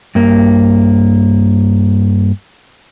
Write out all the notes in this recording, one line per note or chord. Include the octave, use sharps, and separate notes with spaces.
G2 A#3